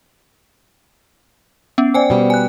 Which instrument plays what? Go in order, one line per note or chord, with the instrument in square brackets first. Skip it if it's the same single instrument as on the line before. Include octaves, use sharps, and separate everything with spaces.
[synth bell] B3 C#4
[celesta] C5 D5 [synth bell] G5 G#5
[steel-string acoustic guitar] B2 G3
[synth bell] G#5 F#6